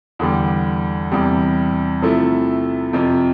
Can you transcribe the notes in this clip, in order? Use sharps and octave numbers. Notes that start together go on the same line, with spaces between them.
E2 D3 G3
E2 C3 G3
C3 F3 A3 E4
F2 C3 F3